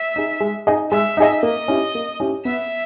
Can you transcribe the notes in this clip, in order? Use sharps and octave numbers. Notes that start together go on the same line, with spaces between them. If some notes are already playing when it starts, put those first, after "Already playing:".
Already playing: E5
D#4 G#4
G#3
D#4 G#4 D#5
G#3 E5
D#4 G#4 D#5
A#3 D#5
C#4 E4 G4
A#3
C#4 E4 G4
B3 E5